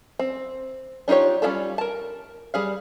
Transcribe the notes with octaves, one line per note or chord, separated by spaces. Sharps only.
C4
D4 D#4 F4 G4 C#5
G3 C#4 E4 F4 A4
A#4 A5
G3 G#4 F5